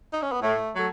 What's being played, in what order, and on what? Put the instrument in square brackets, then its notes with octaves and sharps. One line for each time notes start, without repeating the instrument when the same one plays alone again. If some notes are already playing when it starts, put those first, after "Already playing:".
[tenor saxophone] D#4
C#4
B3
[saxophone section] A2 [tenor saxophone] A3
[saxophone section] F#3 A3